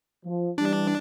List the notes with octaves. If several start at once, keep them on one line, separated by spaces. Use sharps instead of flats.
F3
E3 G3 D4